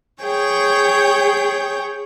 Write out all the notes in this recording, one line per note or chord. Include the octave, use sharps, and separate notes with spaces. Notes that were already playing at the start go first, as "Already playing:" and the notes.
G#4 C#5 G5 G6